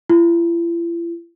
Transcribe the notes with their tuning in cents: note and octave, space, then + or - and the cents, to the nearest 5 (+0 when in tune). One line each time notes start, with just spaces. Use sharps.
E4 +45